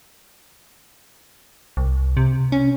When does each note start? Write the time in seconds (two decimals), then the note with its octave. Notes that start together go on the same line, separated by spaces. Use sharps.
1.77 C2
2.17 C3
2.52 C#4